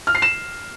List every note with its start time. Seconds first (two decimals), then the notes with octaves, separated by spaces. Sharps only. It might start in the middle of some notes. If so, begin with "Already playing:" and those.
0.07 F6
0.15 C7
0.22 E7